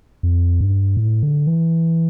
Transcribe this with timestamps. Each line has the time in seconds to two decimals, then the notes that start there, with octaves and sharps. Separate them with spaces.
0.23 F2
0.61 G2
0.97 A2
1.22 D3
1.47 E3